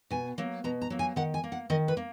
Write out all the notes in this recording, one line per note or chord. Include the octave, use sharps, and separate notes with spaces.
B2 G#5
F#3 A#3
B2 A#5
A#5
F#3 A#3
G#5
D#3 F#5
G#5
A#3
F#5
D#3 D#5
B4
A#3